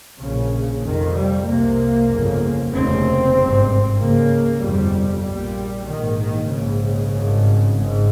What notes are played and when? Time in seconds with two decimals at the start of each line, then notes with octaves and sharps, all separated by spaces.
0.19 A#1 A#2 C#3
0.83 F1 F2 C3 D#3
1.14 G3
1.45 C2 C3 A#3
2.09 G1 F2 C#3
2.71 F1 D#2 C#3 C4
3.34 G#1 G2
3.97 C#2 C#3 A#3
4.61 G1 F2 C3 G3
5.24 A#1 A#2 G3
5.87 A#1 G#2 D#3
6.19 D#3
6.49 A#1 G#2 C#3
7.12 G#1 G2
7.75 G#1 G#2